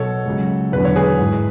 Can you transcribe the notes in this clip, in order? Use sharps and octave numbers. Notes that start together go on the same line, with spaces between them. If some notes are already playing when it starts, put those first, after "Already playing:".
Already playing: B1 B2 F#3 A4 C#5
C#2 C#3 F#3
E1 E2 D3 F#3 B4
C#5
G#4 B4
G#1 G#2 E3